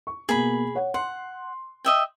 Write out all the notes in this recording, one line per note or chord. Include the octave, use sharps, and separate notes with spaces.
C#6
B2 A#3 G#4 B5
C#5 F#5
F#5 C6
D#5 E5 G5